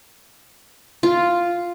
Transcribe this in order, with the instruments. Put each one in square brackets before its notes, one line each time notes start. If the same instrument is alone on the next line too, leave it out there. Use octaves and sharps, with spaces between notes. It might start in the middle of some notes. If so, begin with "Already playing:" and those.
[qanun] F4